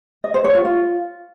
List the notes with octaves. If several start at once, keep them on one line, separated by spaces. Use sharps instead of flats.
D#5
C5
C#5
F4
F4